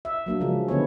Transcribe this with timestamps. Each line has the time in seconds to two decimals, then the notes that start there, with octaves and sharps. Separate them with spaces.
0.05 E5
0.26 F#3 A#3 D4
0.40 C#3 F3 G#3
0.68 D3 B3 E4 C#5